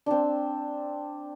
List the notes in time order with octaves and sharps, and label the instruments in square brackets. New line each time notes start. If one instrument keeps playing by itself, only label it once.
[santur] C4 D4